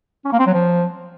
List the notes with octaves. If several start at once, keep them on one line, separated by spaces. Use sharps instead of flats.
C#4
A#3
C4
F#3
F3